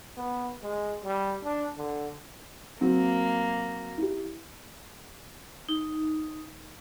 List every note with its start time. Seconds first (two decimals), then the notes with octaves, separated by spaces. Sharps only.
0.17 B3
0.63 G#3
1.04 G3
1.44 D4
1.77 D3
2.81 F#3 A#3 C4
3.97 E4 G4
5.69 D#4